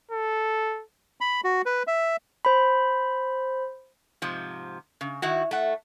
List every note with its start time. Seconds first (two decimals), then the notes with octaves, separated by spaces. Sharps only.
0.12 A4
1.21 B5
1.44 F#4
1.66 B4
1.87 E5
2.45 C5 B5
4.22 G#2 C3 F3
5.01 C#3
5.22 D#3 E4 F#4
5.51 A3 F#5